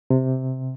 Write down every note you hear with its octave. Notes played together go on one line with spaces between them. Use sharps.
C3